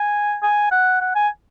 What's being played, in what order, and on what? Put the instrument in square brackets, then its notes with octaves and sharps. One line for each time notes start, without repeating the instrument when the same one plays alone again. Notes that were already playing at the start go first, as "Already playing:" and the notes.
Already playing: [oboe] G#5
G#5
F#5
F#5
G#5